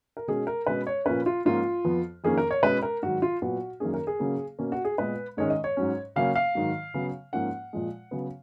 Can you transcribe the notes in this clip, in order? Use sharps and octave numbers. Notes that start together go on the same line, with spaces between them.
A#4
B2 G#3 C#4 G#4
A#4
B2 G#3 C#4 B4
C#5
A#2 F3 A#3 C#4 B4
F4
G#2 F3 A#3 C#4 F4
F2 F3 B3
F2 D#3 A#3 C#4 G#4
A#4
C#5
B2 G#3 C#4 B4
A#4
G#2 D#3 F#3 F#4
F4
A#2 F#3 B3 F#4
F#2 D#3 A#3 C#4 G#4
A#4
G#4
C#3 F#3 A#3 C#4
B2 A#3 C#4
F#4
G#4
A#2 G#3 B3 B4
G#2 D#3 G#3 C#4 C#5
D#5
C#5
G#2 F#3 C#4
C#3 F#3 A#3 C#4 F5
F5
G#2 D#3 F#3
C#3 F#3 B3
G#2 F3 A#3 C#4 F#5
A#2 F3 G#3
C#3 F#3 B3